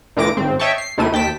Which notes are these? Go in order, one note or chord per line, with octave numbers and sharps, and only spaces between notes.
D2 A#2 E3 D6 A#6 D7
G#1 C4
C#5 D#5 E5 G5 A5 C#6
C7
D#2 C3 A3 E4 D#7
D#2 G5 A5 B6